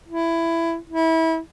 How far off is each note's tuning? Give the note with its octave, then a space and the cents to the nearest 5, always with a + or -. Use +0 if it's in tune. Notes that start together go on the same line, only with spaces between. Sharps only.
E4 +15
E4 -25